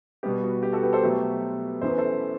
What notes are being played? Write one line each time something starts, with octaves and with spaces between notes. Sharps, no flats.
B2 G3 B3 G4
F#4
G4
F#4 A4
G4 B4
A4 C5
B2 F#3 A3 G4 B4
F#2 E3 B3 C5
B4
A4 C5